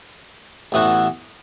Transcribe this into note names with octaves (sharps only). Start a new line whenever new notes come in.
A1 A2 E3 B3 F#4